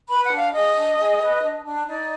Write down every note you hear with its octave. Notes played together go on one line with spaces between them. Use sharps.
B4 B5
F#5
D4
F5
G#4 D#5
D4
G#4
B4
D4
D4
D#4 D5